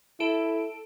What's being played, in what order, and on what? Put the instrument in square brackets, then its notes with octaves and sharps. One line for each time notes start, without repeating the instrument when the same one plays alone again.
[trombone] E4 [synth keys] A4 D7